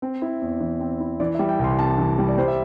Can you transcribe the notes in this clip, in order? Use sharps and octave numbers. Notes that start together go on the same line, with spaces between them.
C4 C5
E4
E2
E3
C4
E4
E3 D5
E5
G3
G5
C2 C6
C3 A5
E3
G3
D5
G3 C5
E5